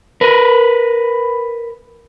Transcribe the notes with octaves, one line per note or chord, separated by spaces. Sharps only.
A#4 B4